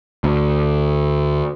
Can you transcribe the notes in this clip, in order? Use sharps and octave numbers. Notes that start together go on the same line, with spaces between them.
D2